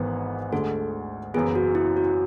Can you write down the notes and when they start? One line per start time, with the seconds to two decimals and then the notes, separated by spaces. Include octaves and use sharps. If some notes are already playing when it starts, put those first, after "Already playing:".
Already playing: G#1 G#2 E3 B3
0.52 D2 D3 G#3 A4
1.34 F#1 F#2 E3 B3 G#4
1.55 F#4
1.75 E4
1.97 F#4